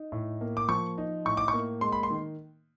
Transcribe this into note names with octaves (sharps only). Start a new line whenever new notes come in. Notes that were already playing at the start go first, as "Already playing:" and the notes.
Already playing: D#4
A2
A#3
D6
F3 C#6
D#4
A2 C#6
D6
C#6
A#3
G#3 C6
B5
C6
D#3